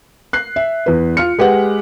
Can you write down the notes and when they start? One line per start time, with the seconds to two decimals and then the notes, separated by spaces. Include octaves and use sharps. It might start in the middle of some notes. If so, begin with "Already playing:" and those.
0.33 F#6 C7
0.56 E5
0.86 E2 B4
1.17 F4 F6 C#7
1.39 G#3 G4 B4 F#5